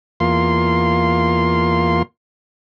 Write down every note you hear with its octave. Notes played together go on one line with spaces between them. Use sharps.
E2 A#3 F4 C6